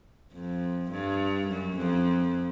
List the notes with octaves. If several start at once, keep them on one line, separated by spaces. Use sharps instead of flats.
F2
G2
F#2
F2